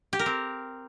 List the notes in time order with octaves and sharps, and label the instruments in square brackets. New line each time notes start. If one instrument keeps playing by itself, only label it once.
[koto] G4
A#4
C4